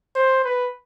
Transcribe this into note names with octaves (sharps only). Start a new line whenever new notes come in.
C5
B4